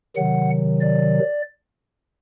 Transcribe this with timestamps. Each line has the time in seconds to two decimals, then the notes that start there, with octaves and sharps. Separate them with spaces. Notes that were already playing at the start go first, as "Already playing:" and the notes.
0.16 C3 D#3 F#3 F#5
0.81 D5